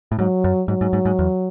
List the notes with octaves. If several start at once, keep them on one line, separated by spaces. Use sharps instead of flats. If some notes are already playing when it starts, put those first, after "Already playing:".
A2
G#2 F#3
F#2
G#2 F#3
G#2
G#2
G#2
E2